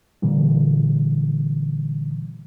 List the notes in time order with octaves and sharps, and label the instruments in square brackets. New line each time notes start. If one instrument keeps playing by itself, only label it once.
[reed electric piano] A#2 D3 E3 G3